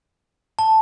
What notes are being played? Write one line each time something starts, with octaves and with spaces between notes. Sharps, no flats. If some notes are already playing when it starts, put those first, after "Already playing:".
A5